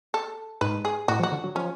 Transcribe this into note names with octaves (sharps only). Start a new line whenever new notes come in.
A4
G#2 B4
G#4
A2 F#4
F3
F#4
D3
F#3
F3 C#4